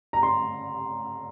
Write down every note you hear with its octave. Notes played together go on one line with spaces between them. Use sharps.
A#5
C6